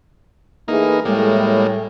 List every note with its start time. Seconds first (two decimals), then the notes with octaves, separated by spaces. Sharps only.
0.68 E3 A3 A#3 D#4 G#4
1.05 A2 G3 G#3 A#3